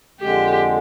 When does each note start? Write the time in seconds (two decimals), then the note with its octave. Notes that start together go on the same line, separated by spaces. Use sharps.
0.20 F2 D3 G#3 G4